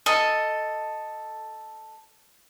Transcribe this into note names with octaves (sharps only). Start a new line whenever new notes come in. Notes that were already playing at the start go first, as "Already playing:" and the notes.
A4 D#5